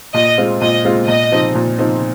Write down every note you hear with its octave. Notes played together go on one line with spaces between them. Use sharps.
A#2 D#5
G#3 C4 F4
A#2 D#5
G#3 C4 F4
A#2 D#5
F3 C4 D#4
A#2
F3 C4 D#4